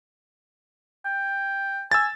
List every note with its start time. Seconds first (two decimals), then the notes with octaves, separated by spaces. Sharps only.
1.05 G5
1.92 G#5 E6 G#6 A6